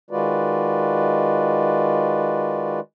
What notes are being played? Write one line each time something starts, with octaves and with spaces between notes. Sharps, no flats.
D#3 G#3 F4 F#4 B4 D5